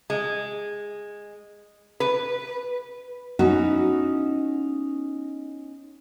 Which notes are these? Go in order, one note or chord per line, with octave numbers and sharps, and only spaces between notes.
G#3
B4
B3 C#4 D#4 E4 F#4